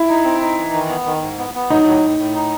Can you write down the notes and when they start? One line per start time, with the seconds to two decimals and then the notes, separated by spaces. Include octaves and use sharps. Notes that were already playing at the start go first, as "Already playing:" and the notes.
Already playing: E4
0.09 D#4
0.25 C4
0.41 D#4
0.58 E3
0.73 D#3
0.89 B3
1.06 D#3
1.22 G#2
1.38 B3
1.54 B3
1.70 F#3 D#4
1.87 A2
2.03 A2
2.19 A2
2.35 D#4